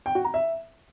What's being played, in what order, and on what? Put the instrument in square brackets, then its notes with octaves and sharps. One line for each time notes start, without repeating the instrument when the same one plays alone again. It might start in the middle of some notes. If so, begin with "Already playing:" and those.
[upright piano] G5
F#4
A#5
E5